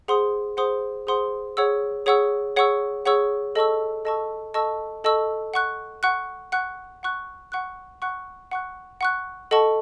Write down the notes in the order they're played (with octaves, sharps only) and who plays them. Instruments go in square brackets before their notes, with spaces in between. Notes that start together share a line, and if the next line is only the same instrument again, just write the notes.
[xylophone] G#4 C5 F#5 C6 D#6
G#4 C5 F#5 C6 D#6
G#4 C5 F#5 C6 D#6
G#4 C#5 F#5 C#6 E6
G#4 C#5 F#5 C#6 E6
G#4 C#5 F#5 C#6 E6
G#4 C#5 F#5 C#6 E6
A4 D#5 A5 C#6 E6
A4 D#5 A5 C#6 E6
A4 D#5 A5 C#6 E6
A4 D#5 A5 C#6 E6
F#5 C#6 F#6
F#5 C#6 F#6
F#5 C#6 F#6
F#5 C#6 F#6
F#5 C#6 F#6
F#5 C#6 F#6
F#5 C#6 F#6
F#5 C#6 F#6
A4 D#5 F#5 A5 C#6